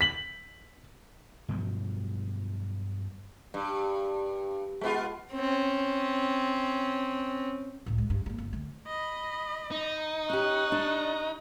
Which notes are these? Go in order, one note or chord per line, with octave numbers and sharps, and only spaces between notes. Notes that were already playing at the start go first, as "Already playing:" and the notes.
B6 F#7
G2 B2 F3 F#3
G2
G#3 B3 F4
C4 C#4
C#2 A2
G#3
G2
G#3 A#3
G1
D3 A3
D#5 B5
D#4
C#4 G4 C#6 F#6
D4